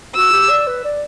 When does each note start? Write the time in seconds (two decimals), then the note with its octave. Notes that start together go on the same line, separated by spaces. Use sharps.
0.15 F#4 E6
0.32 G4
0.50 D5
0.67 B4
0.84 D5